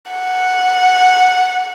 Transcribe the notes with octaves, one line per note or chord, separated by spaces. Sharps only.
F#5